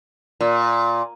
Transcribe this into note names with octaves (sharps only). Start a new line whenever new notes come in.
A#2